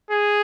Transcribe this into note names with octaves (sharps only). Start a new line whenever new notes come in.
G#4